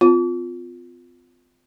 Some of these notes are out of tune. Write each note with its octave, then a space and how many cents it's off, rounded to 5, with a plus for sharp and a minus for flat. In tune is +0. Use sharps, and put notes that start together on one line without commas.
C4 -45 F4 +10